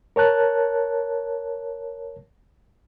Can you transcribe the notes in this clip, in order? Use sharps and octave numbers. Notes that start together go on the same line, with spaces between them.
A#4 C#5 A5 F#6